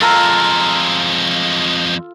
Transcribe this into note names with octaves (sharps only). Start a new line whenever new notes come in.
F2 G#3 F4 A4 A#5